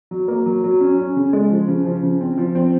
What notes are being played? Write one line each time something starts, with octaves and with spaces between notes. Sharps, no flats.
F#3
A#3
F#3
F#3
C#4
C#4
C#3
G#3
F3
C#3
F3
C#3
C4
F3
C4